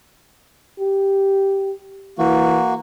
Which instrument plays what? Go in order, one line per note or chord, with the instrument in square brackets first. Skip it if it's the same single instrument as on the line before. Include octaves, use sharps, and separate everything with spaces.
[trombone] G4
[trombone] E3 [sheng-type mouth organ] A#3 F#4